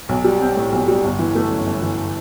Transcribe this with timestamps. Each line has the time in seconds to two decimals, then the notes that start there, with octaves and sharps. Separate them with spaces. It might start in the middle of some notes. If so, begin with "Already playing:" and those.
0.09 B1
0.24 G3
0.41 C4
0.56 A2
0.72 B1
0.88 G3
1.04 G1
1.19 E3
1.35 A3
1.51 F#2
1.67 G1
1.82 E3